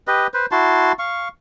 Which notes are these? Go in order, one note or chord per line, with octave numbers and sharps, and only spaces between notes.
G4 B4 D#5
B4 C5
E4 F#4 A5 C6
F5 C#6